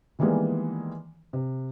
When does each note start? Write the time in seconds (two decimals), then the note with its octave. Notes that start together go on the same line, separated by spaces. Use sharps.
0.19 D#3 E3 G3 G#3 A#3 B3
1.33 C3